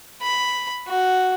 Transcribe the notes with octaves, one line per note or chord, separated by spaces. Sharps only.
B5
F#4